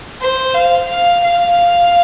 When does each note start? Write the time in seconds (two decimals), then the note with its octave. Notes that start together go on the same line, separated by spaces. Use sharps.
0.21 C5
0.55 F5
0.89 F5
1.23 F5